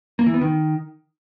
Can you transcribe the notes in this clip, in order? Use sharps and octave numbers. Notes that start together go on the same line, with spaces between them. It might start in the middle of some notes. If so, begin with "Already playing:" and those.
A#3
E3
B3
D#3